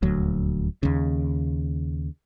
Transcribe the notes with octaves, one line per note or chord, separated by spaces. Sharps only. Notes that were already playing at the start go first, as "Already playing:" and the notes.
D#1 D2 F#3
D#2 C#3